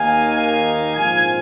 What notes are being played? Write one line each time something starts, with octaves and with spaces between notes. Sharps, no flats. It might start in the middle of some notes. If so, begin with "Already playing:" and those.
Already playing: D#2 D#3 A#3 D#4 F5 G#5
F5 G#5
A#1 G#2 F3 C4 F5 G#5